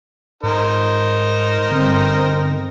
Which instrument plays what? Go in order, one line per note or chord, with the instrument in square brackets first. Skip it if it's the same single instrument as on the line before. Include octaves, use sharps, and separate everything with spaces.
[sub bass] G#2 [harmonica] D#4 A#4 C5
[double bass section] G1 G2 C4 [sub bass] D3